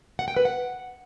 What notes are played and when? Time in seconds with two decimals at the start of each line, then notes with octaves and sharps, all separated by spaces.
0.19 F#5
0.28 G5
0.36 B4
0.45 F#5